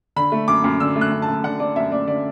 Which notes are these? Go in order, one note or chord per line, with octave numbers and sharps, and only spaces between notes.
D3 B5
A3
F#2 D6
F#2
D3 E6
A3
F#6
F#2
A5
F#2
D3 F#5
A3 D5
F#2 E5
F#2 D5
D3 D5